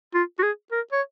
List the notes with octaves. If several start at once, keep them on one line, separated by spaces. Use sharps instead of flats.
F4
F#4
G#4
A#4
C#5